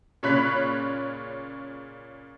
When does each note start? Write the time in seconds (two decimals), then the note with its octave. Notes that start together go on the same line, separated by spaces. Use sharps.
0.23 A#2 C#3 C#5 B5 F#6 B6